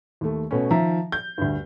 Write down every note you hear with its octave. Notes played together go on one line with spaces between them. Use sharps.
D#2 A3
B2 A3 C#4
D#3 F3 E5 A#5
G6
D2 G2